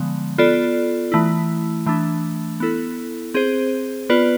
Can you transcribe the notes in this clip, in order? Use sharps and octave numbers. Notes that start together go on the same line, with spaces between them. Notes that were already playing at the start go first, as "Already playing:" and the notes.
Already playing: D3 F3 G#3 B3
B3 F4 A4 D5
E3 A3 E4
E3 A3 D4
B3 E4 A4
C4 G#4 C5
B3 F4 B4 D5